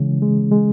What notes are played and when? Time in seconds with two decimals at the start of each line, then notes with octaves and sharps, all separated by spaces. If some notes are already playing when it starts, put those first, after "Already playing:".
Already playing: C#3 E3 G#3 C#4
0.22 G#3
0.51 G#3